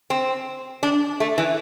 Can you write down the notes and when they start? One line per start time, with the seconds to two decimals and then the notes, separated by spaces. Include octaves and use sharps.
0.10 C4
0.83 D4
1.20 A3
1.38 E3